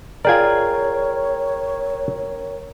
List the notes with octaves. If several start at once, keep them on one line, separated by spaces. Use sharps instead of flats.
F4 G#4 A#4 C#5 D5 G5 G#6